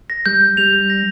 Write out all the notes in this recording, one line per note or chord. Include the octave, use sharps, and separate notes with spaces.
A#6
G3 G6
G6
G3 F7
G6
A#6